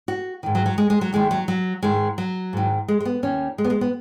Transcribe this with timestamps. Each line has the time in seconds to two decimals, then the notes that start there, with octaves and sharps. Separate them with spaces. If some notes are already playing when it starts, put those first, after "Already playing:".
0.08 F#4
0.43 G#2 D#3
0.55 F#3
0.66 F#3
0.78 G#3
0.90 G#3
1.01 F#3
1.13 D#2 D#3 G#3
1.31 F#3
1.48 F#3
1.83 G#2 D#3 G#3
2.18 F#3
2.53 G#2 D#3
2.88 G#3
3.00 G#3
3.05 B3
3.23 D#2 D#3 C#4
3.58 G#3
3.64 B3
3.70 G#3
3.81 B3